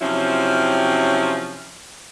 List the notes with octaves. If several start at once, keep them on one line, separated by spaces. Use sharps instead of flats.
C3 F3 F#3 C4 C#4 E4